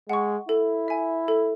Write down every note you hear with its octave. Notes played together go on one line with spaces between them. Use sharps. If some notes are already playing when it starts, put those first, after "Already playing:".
G#3 F#5 C#6
E4 A4
E5 G#5
A4